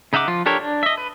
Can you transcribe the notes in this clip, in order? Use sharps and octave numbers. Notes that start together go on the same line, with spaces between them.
C#3 D#4 E5 F#5 D6
F3 F4
D4 G4 A4 A#4 C#5
D4
D#5 E5
B4